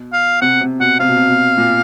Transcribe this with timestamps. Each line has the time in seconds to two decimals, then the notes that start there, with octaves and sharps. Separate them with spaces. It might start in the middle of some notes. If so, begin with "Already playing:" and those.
Already playing: B2
0.13 F5
0.42 C3 F#5
0.61 C3
0.80 B2 F#5
1.00 C3 F5
1.08 B2
1.17 C3
1.29 B2
1.58 A#2